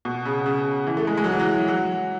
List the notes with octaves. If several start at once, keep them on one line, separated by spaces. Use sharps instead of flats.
B2
C#3
C#3
E3
A3
G#3
G#3
F#3
E3
F#3
F#3